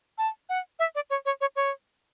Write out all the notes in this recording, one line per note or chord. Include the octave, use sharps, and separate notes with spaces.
A5
F#5
E5
D5
C#5
C#5
C#5
C#5